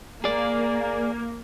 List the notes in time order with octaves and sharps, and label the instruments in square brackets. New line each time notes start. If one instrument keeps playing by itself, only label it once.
[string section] A#3 [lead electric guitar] G#4 D5